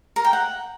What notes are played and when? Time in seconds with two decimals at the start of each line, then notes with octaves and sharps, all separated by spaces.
0.16 A#4
0.25 G5
0.33 F#5